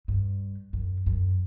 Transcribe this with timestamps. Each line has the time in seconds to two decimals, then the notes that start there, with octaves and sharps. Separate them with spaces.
0.08 G2
0.73 F#2
1.06 F#2